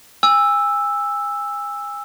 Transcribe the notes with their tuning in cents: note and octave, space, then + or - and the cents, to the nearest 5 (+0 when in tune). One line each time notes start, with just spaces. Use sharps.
G#5 -30 E6 +0